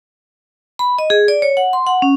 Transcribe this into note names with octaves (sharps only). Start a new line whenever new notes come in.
B5
D#5
G#4
D5
C#5
F#5
C6
F#5
C#4